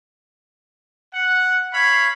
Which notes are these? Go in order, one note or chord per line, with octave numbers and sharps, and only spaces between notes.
F#5
C#5 F5 B5